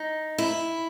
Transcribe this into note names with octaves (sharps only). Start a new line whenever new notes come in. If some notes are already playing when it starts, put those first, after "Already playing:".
Already playing: D#4
E4